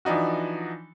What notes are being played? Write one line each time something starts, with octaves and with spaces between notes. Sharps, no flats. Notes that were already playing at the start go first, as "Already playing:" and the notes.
E3 F3 D4 D#4 F#4